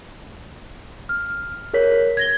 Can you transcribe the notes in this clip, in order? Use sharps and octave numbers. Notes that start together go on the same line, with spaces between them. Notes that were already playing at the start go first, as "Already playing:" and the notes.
F6
G#4 A#4 C#5 B6
G#6 A#6 G7